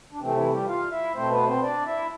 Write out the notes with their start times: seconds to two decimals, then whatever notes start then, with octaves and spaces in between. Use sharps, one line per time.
0.12 D4
0.20 C3 E3 A3 C4
0.35 E3 E4
0.52 G3 G4
0.67 F4 F5
0.91 E4 E5
1.15 B2 A3 C4 C5
1.30 B3 B4
1.46 C4 C5
1.62 D4 D5
1.86 E4 E5